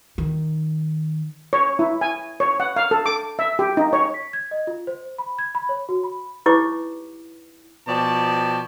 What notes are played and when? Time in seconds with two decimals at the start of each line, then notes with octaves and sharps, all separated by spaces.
0.18 D#3
1.53 C#5
1.79 E4
2.01 G#5
2.40 C#5
2.60 F#5
2.76 F5
2.91 A4
3.06 D6
3.39 E5
3.59 G4
3.77 D#4
3.93 C#5
4.14 B6
4.33 G#6
4.51 D#5
4.67 F4
4.87 C5
5.18 B5
5.39 G#6
5.55 B5
5.69 C#5
5.89 F#4
6.04 B5
6.46 D#4 E4 G4 B4 C#5 D6
7.88 B2 F3 D5 G5 A5